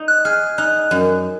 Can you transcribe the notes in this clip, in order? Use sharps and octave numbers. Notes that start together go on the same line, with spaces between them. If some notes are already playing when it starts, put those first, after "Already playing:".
Already playing: D#4
F#6
G#4 F6
D#4 F#6
F#2